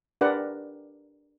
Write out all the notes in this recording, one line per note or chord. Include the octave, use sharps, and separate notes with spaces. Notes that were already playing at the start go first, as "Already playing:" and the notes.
D4 G4 A#4 B4 D5 F#5